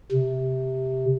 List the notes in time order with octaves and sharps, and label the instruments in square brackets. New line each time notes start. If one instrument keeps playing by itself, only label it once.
[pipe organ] C3